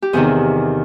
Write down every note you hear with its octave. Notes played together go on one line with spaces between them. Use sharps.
G4
E2 C3 D#3 G#4